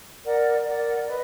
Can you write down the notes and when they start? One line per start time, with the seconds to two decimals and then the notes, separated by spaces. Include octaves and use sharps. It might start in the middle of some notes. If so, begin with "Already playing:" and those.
0.24 A#4 D5 F#5
0.65 A#4 D5 F#5
1.07 B4 D#5